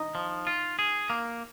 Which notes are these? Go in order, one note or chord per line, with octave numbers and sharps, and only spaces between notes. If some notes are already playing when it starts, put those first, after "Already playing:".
Already playing: D#4
F3
F4
G#4
A#3